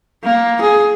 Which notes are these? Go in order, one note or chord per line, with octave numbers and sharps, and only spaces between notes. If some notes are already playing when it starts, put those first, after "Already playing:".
A#3
G#4